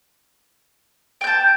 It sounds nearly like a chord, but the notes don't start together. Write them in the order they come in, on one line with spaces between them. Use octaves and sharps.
G5 G6 A5